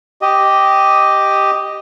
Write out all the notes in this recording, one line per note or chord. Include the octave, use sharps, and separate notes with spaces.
G4 D#5